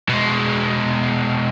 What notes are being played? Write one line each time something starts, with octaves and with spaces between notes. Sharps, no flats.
B2 G#3